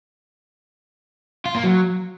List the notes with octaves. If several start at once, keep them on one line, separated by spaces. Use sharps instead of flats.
F4
A#3
F#3